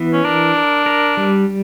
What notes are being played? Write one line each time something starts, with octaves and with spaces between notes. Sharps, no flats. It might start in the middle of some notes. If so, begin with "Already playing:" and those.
Already playing: E3 B3
C#4
D4 A#4
A#4
A#4
G3